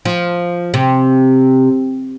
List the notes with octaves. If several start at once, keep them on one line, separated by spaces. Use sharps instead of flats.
F3
C3